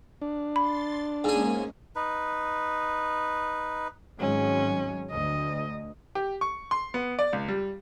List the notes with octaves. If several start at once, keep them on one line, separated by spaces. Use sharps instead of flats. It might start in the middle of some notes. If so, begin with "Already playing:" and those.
D4
B5 C6 A6
G#2 G#3 A#3 C#4 G#4
D#4 B4
G#1 F#3 G#3 C#4
D2 D#5
G4
C#6
C6
B3
D5
C#2
G3